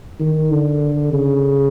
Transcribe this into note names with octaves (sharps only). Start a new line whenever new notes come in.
D#3
D3
C#3